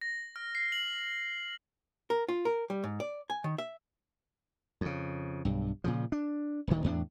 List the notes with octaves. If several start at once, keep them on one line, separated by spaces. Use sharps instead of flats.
A#6
F6
C7
F#7
A#4
F4
A#4
G3
G#2
D5
G#5
D#3
E5
F2 C#3
B1 G2
A#2 C#3 F3
D4
D#1 D2 D#3
E2 A2 D4